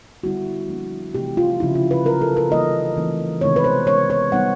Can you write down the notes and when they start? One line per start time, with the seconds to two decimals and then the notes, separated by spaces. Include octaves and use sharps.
0.24 D3 G3 B3 E4 F#4
0.69 F3 A#3 D4
1.14 C3 E3 A3 C4 E4 G4
1.37 F4
1.60 C#3 F3 A#3 D4 E4
1.75 F4
1.91 B4
2.05 F#3 B3 D#4 A#4
2.21 A4
2.37 A#4
2.51 E3 G3 A#3 D#4 D#5
2.96 E3 A3 C4 D#4
3.41 C3 D#3 G#3 B3 C#5
3.56 B4
3.64 C5
3.87 D#3 G#3 B3 C#5
4.10 C#5
4.32 D#3 G3 B3 D#4 F#5